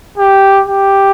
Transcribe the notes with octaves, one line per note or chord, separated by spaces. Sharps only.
G4
G4